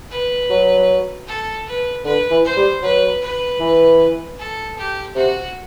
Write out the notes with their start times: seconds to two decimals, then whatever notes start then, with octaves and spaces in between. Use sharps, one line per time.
0.10 B4
0.50 F#3
1.27 A4
1.66 B4
2.05 D3 B4
2.31 E3
2.44 C5
2.57 G3
2.82 F#3 B4
3.22 B4
3.60 E3
4.39 A4
4.77 G4
5.15 C3 F#4